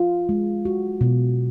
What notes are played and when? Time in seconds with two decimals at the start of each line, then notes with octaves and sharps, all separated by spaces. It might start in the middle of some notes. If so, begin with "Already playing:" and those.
Already playing: F4
0.29 G#3
0.65 F#4
1.01 B2